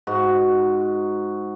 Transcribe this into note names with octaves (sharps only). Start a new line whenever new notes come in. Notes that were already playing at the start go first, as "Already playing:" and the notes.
G#2 F#4